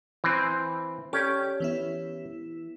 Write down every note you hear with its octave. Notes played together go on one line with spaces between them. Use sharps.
E3 C4
C#4 G4 A4 D5
E3 B3 E4